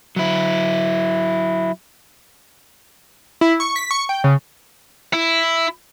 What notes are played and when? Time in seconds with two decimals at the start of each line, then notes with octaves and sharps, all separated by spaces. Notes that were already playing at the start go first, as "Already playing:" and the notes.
0.16 F#3 E4
3.41 E4
3.60 C#6
3.76 B6
3.91 C#6
4.09 G5
4.24 C#3
5.13 E4